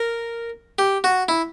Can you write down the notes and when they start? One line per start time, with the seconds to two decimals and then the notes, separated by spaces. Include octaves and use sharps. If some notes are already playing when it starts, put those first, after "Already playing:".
Already playing: A#4
0.79 G4
1.04 F#4
1.28 E4